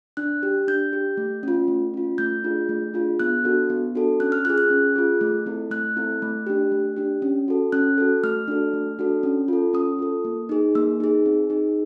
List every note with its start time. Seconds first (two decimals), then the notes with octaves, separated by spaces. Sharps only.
0.17 D4 F#6
0.43 G4
0.68 D4 G6
0.93 G4
1.17 A3
1.43 C#4 F4
1.68 A3
1.94 C#4 F4
2.18 A3 G6
2.44 D4 F4 G#4
2.69 A3
2.94 D4 F4 G#4
3.20 B3 F#6
3.45 D4 F#4 A4
3.70 B3
3.95 D4 F#4 A4
4.20 C#4 F#6
4.32 F6
4.45 F4 G#4 F#6
4.58 F#6
4.70 C#4
4.96 F4 G#4
5.21 A3
5.46 C4 E4 A4
5.71 A3 F#6
5.97 C4 E4 A4
6.22 A3
6.46 D4 G4
6.72 A3
6.96 D4 G4
7.22 C#4
7.48 F#4 A4
7.72 C#4 F#6
7.98 F#4 A4
8.24 A3 F6
8.48 D4 F#4 A4
8.74 A3
8.99 D4 F#4 A4
9.23 C#4
9.48 F4 A4
9.73 C#4 D#6
9.99 F4 A4
10.25 A#3
10.49 D#4 G#4
10.75 A#3 E6
11.00 D#4 G#4
11.26 C4
11.50 D#4 G#4